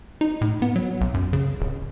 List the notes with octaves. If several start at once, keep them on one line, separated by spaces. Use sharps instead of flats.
D#4
A2
B3
F#3
B1
F#2
C#3
D1